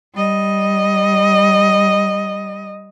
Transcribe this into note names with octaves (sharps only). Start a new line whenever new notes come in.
G3 D#5